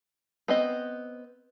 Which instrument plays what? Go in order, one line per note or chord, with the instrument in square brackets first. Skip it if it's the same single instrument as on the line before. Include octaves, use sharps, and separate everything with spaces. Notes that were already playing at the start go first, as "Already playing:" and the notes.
[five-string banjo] B3 C4 D#5